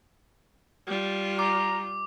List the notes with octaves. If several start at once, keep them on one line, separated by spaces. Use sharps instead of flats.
G3 F4
A#5 D6